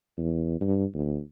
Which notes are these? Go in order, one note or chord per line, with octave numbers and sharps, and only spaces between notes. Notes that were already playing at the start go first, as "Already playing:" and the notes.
E2
G2
D2